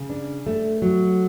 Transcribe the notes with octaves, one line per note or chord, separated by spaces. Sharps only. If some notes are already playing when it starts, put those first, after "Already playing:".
Already playing: C#3
D4
A3
F#3